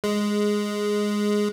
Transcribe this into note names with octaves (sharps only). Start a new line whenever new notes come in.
G#3